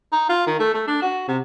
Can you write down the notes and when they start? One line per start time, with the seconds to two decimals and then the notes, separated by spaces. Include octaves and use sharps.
0.13 D#4
0.29 F4
0.47 D#3
0.60 A3
0.74 A3
0.87 D4
1.02 F#4
1.28 C3